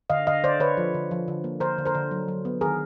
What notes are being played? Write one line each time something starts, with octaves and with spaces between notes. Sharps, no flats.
D3 D#5 F5
D3 D#5 F5
D3 C5 D5
D3 B4 C#5
F3
D3
F3
D3
A#3
D3 A#4 C5
D3
A#4 C5
D3
F#3
F#3
B3
D#3 G#4 A#4